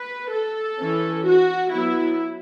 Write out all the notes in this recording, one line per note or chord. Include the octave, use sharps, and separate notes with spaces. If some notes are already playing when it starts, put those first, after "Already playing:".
Already playing: B4
A4
E3 C#4
F#4
F#3 B3 E4